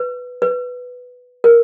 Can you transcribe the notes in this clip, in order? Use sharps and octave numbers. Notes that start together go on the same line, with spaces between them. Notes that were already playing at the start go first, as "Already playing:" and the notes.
Already playing: B4
B4
A#4